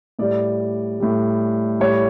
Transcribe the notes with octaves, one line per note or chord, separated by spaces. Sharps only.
A2 G3 D5
A2 G3
A2 G3 C#5